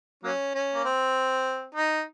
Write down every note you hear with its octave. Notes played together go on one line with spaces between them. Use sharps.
F#3 A#3 C#4
C#4
A#3
C4
D#4